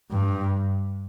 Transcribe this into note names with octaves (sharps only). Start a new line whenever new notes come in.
G2